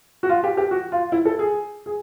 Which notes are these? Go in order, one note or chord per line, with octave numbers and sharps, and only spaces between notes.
F#4
F4
G4
G4
F#4
F4
E4
A4
G#4
G#4